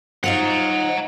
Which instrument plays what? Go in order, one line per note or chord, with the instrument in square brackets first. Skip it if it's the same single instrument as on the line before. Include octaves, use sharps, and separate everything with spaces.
[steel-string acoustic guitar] D#4 F4 C5 [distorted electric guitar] F#5 A#5